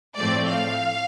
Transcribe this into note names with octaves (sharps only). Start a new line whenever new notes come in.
A2 F3 A3 C4 D5
F5